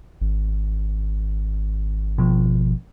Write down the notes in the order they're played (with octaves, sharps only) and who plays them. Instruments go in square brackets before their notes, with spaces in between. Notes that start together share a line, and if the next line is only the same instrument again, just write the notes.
[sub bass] G#1
[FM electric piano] B2 F3